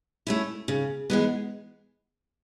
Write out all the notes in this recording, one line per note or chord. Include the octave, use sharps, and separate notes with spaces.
A3 C#4 E4
C#3
E3 G#3 B3